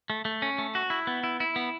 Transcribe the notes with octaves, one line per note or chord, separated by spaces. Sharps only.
A3
A3
C#4
A3
F#4
E4
B3
E4
E4
B3